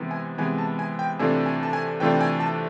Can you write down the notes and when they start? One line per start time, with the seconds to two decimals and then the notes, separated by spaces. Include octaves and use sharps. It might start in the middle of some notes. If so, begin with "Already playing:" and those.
Already playing: C3 E3 G#3 B3
0.11 G#5
0.38 C3 E3 G#3 B3 G#5
0.58 A5
0.79 G#5
0.99 G5
1.19 C3 E3 A3 D4 F4 G#5
1.46 G#5
1.63 A5
1.73 G#5
2.00 C3 E3 A3 D4 F4 G5
2.14 G5
2.21 G#5
2.40 A5